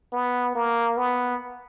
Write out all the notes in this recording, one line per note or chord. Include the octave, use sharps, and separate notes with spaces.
B3
A#3
B3